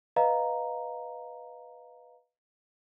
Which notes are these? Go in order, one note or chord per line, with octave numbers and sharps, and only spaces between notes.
B4 D#5 F5 A#5